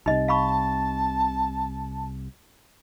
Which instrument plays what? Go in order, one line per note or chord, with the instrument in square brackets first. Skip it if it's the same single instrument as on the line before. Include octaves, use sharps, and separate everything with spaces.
[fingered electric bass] C2 C3 [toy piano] D#4 D#5
[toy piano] F5 B5 C#6 [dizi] A5